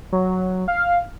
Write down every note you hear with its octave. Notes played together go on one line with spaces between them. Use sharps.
F#3
F5